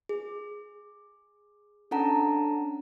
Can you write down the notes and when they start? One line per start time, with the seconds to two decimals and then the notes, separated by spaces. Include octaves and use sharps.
0.09 G#4
1.91 C#4 D4 A4 F#5 A5 A#5